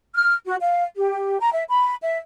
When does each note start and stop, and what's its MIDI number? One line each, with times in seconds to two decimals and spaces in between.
0.15 0.34 89
0.46 0.56 66
0.61 0.83 77
0.96 1.37 67
1.40 1.50 82
1.53 1.62 76
1.68 1.95 83
2.02 2.18 76